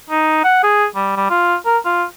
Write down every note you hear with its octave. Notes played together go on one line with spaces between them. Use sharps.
D#4
F#5
G#4
G3
G3
F4
A#4
F4